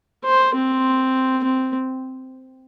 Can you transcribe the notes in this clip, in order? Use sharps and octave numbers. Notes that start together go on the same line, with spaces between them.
C5
C4
C4